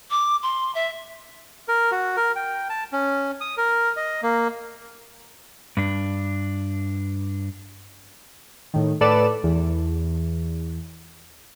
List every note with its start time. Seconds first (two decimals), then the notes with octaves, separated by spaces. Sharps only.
0.10 D6
0.43 C6
0.75 E5
1.68 A#4
1.92 F#4
2.17 A#4
2.36 G5
2.70 A5
2.92 C#4
3.41 D#6
3.57 A#4
3.97 D#5
4.23 A#3
5.77 G2 D4
8.74 A2 D#3
9.01 A2 A4 B4 D5 E7
9.43 E2